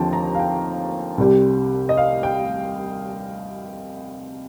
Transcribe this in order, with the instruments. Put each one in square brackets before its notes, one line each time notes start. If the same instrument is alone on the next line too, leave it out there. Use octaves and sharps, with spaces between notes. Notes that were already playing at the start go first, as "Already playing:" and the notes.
Already playing: [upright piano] D#2 D3 F3 C4 G5 A5
A#5
F5
G5
C2 C3 G3
D#5
F5
G5